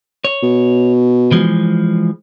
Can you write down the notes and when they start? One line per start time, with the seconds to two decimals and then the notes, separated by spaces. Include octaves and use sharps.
0.24 C#5
0.43 B2
1.31 E3 F3 G#3